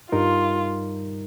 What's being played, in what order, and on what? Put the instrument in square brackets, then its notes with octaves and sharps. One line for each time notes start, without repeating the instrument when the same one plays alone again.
[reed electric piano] G2 G3 D#4 A#4 [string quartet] F4